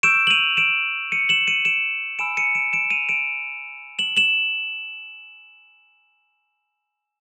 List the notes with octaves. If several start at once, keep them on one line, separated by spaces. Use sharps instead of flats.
C#6 E6 G6 D7 E7
F#7
D#7 F7
D7 E7
C#7 D#7
E7 F#7
C#7 D#7
D7 E7
G#5 B5 E6 D7 E7
C#7 D#7
D7 E7
D7 E7
D#7 F7
D7 E7
E7 F#7
E7 F#7